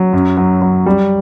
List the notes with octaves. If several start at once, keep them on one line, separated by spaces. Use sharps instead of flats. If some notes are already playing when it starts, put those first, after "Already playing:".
Already playing: F#3
F#2
F#3
F#3
G3